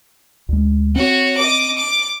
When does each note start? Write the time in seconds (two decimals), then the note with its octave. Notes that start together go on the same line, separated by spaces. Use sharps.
0.49 D2 G#3
0.96 C4 F#4 C#5
1.38 D#5 D6
1.78 D6